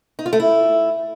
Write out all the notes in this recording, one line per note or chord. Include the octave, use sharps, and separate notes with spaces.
D#4
F4
A3
E4